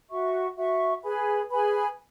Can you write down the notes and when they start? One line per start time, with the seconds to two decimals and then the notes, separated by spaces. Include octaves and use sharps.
0.10 F#4 E5 C#6
0.56 F#4 E5 C#6
1.03 G#4 B4 G#5 B5
1.49 G#4 B4 G#5 B5